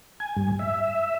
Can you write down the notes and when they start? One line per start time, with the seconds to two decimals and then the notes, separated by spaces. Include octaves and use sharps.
0.20 G#5
0.37 G2
0.59 E5